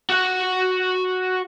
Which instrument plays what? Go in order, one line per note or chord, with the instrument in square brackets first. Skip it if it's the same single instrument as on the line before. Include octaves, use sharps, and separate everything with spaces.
[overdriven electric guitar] F#4 F#5